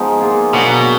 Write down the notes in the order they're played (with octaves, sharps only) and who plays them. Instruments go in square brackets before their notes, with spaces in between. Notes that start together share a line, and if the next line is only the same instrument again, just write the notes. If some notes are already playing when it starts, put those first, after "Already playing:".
Already playing: [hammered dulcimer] F3 G#3 B3 D#4 B4
A#3 F4 G#4
[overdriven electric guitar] B2 [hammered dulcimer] D3 F#3 A#3